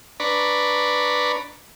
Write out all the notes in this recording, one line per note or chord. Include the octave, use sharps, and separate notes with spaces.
D4 B4 D5 A#5 B5 C#6